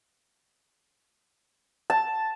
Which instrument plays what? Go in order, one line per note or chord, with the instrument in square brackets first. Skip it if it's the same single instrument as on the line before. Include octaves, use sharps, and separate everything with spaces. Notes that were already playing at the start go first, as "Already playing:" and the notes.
[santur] A5